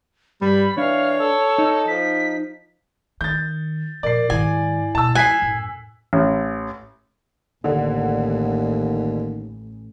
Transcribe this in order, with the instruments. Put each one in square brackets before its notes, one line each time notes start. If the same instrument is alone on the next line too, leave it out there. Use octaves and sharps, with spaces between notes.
[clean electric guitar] G2 [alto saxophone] G3 [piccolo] B5
[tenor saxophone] E3 [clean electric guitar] D4 [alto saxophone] C#5 [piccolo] F5
[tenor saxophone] A4 [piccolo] E6
[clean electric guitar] D#4
[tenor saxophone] F3 [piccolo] B6
[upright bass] D#3 [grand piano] G6 A6
[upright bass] A#2 F3 [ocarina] A#4 [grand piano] D5 C7
[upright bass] G#2 D#3 [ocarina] E4 [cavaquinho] G#5
[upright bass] C#2 B2 [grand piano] A5 E6
[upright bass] F3 G#3 [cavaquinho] G#5 [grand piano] F#6 B6 C7
[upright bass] F#2 A2
[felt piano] A1
[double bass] A1 [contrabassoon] D#2 [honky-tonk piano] D3